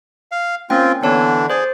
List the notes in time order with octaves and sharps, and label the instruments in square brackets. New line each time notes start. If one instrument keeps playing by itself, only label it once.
[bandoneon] F5
[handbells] A#3 C#4 G5 [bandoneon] C4 F4
[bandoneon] D3 E3 D4 [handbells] B3 C#5 A5
[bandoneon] G#4 [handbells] C5 D5